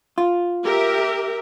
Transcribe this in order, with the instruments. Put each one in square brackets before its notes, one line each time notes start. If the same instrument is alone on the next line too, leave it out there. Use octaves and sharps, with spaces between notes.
[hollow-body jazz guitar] F4
[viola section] G4 A#4 E5